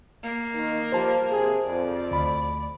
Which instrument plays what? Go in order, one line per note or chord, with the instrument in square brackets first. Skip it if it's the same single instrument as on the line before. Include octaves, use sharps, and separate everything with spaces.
[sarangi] A#3
[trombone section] D#3
[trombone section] F3 G3 [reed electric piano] C5 A5
[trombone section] C3 G#4
[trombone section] F2 [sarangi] D5
[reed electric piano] D2 B5